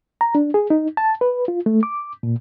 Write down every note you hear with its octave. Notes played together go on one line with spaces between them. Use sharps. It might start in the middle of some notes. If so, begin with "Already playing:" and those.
A#5
D4
G#4
D#4
A5
B4
F4
A3
D6
A#2